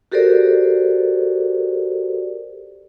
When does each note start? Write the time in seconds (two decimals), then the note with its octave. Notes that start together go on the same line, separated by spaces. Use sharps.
0.12 F#4 G4 A4 A#4 C5 D5